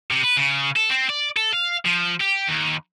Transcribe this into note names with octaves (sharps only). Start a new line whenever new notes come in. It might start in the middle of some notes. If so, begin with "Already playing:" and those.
C3
B4
C#3
A4
C4
D5
A4
F5
F3
G4
D#2